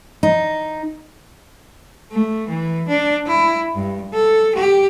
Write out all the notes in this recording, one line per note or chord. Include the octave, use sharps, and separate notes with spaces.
D#4
A3
E3
D4
E4
G2
A4
G4